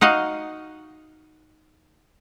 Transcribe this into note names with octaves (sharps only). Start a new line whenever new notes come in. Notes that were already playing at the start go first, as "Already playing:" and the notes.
D#4 F#4 D#5 F5